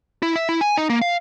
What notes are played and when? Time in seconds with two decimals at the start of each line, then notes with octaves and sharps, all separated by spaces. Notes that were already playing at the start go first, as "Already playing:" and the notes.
0.22 E4
0.36 E5
0.49 E4
0.61 G#5
0.77 D#4
0.90 A#3
1.02 F5